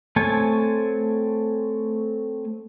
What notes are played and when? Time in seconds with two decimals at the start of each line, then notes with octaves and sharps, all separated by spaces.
0.16 A3 C4 C#5 G#5 A5